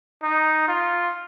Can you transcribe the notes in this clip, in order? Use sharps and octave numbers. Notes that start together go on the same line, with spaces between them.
D#4
F4